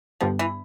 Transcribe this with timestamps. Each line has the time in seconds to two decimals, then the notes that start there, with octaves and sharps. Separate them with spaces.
0.21 G2 D3 F3 G3 B3
0.39 E3